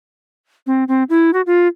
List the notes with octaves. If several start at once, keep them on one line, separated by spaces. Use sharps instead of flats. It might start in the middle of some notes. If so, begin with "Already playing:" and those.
C4
C4
E4
F#4
F4